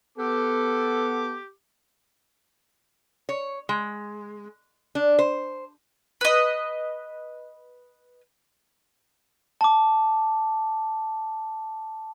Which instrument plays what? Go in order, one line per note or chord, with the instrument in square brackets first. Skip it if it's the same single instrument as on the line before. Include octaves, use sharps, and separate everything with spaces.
[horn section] B3 A4 [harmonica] G4 D6
[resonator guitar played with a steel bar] C#5
G#3
D4
C5
[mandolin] B4 D#5
[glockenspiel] A5 D6